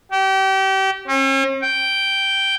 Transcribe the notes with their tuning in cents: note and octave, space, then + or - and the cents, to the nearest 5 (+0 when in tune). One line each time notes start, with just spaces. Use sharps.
G4 -30
C#4 -45
G5 -5